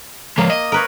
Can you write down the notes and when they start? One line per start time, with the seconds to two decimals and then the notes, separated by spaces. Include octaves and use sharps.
0.38 F3 G#3 A#3
0.50 D#5
0.72 A#4 B4 C#5